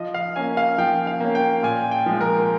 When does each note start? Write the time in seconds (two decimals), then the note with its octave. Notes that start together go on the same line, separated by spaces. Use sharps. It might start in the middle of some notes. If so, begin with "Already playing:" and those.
Already playing: F3 D#5
0.14 F5
0.36 A#3 C#4 G#5
0.57 F5
0.78 F3 G5
1.07 F5
1.20 A#3 C#4
1.35 G5
1.63 A#2 G#5
1.91 G5
2.06 F3 G#3
2.21 A#4